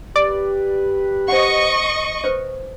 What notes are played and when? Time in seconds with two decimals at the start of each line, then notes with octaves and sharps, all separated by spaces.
0.16 G4 B4 D5
1.28 C5 D#5 F#5 C#6
2.24 B4 C5